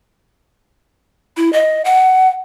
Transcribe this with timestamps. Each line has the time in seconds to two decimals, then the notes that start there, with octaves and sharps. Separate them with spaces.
1.37 E4
1.53 D#5
1.85 F#5